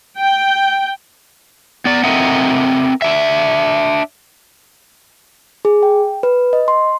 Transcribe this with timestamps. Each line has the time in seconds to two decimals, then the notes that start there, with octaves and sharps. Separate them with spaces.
0.17 G5
1.85 B3 D5
2.04 C4 A4 A#4 D#5 E5 F#5
3.02 D4 E5
5.65 G#4
5.83 G5
6.23 B4
6.53 D#5
6.68 C6